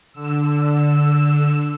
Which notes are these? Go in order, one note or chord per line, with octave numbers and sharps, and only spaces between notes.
D3 E6